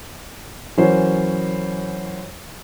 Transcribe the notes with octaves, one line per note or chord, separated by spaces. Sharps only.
E3 F#3 C#4 A#4 C5 C#5